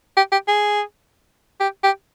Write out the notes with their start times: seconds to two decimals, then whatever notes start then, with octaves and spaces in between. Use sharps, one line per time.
0.17 G4
0.32 G4
0.48 G#4
1.60 G4
1.83 G4